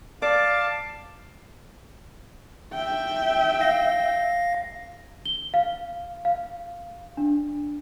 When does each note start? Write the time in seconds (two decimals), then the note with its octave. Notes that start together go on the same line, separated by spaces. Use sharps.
0.22 D5 F5 A5 D6
2.73 E5 G5
3.61 F5 A#6
5.26 G7
5.54 F5
6.25 F5
7.17 D4